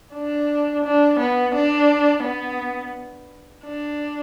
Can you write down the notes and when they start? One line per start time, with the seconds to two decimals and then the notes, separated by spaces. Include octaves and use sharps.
0.14 D4
0.84 D4
1.20 B3
1.54 D4
2.24 B3
3.64 D4